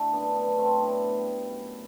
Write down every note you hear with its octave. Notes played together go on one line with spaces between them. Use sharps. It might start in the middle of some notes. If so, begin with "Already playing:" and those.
Already playing: D3 A3 E4
F#2 B3 D4
B3 D4
F#3
A3 C4
A2 B3 D4
G3
F#2